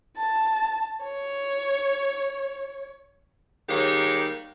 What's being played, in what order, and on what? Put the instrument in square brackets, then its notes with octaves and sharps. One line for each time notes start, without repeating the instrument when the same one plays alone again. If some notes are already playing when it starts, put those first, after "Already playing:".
[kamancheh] A5
C#5
[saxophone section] D#3 G3 G#3 A#3 G4 C#5